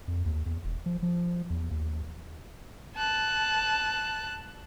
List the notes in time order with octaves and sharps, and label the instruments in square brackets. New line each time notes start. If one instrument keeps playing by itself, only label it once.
[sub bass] F2
D#2
E2
E1
F3
F3
E2
D#2
[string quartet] A5 F#6